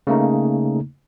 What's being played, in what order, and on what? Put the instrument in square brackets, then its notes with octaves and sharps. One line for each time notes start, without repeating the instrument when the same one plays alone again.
[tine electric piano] C#3 A3 A#3 D#4